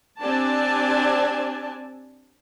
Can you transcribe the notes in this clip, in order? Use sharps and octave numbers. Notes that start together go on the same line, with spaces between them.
C4 D4 G4 D5 G#5 A5